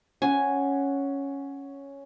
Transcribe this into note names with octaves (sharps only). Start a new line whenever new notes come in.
C#4 F#5 G#5